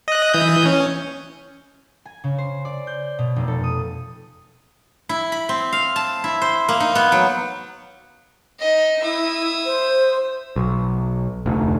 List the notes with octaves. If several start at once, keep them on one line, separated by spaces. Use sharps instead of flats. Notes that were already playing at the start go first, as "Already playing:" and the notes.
D#5 F#6
E3 D#6 G6
C#4
G#5
C#3
C5
D5
G6
B2
F1
A4
D#6
E4
B5
C4
F5
A5
E4
C5
A#3
D#4
B3
F#3
D#4 D#5
E4 E5 D#6
C5
B1
F1 D2